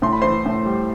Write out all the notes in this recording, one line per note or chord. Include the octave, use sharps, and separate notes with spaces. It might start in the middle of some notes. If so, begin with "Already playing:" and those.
A2 C6
B5
E3 C5 C6
A2
G3